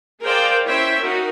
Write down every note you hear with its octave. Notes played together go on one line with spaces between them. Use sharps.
G#4 A#4 C5 D5 F5 G5
C#4 E4 C5 C#5 E5 G5
D#4 F#4 A#4